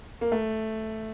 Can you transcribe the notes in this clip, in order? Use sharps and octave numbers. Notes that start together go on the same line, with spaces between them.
A#3
A3